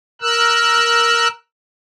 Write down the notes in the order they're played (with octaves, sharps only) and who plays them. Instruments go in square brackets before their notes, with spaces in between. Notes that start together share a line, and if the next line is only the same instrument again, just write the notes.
[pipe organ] A#4 E6 F#6